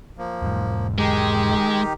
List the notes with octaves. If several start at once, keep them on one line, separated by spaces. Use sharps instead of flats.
F3 A#3
E1 G#2
D#3 G#3 D#4 G4